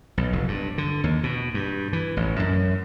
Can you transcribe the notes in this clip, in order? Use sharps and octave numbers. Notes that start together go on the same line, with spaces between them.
B1
F1
G2
D3
D#2
B2
G2
E3
A1
F#2